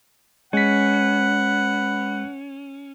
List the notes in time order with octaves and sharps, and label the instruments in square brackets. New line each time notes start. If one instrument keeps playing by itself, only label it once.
[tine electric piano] G#3 B6 [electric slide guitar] C#4 [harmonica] B4 F#5